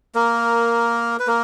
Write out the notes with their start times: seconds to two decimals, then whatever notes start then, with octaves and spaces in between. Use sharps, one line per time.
0.15 A#3 A#4
1.20 B4
1.27 A#3 A#4